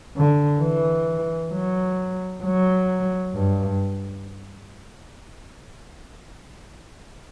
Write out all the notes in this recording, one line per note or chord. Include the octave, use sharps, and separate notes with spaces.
D3
E3
F#3
F#3
G2